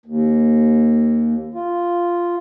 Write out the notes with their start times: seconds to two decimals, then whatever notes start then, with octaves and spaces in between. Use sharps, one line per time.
0.06 D#2
1.54 F4